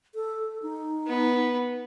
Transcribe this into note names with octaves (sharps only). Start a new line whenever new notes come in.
A4
D#4
B3